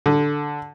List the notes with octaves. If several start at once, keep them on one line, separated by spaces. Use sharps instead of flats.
D3